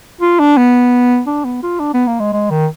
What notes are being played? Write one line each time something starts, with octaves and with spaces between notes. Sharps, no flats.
F4
D4
B3
D4
B3
F4
D4
B3
A#3
G#3
G#3
D#3